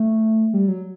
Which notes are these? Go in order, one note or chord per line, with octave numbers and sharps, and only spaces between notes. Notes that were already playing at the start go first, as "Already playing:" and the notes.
Already playing: A3
G3
F#3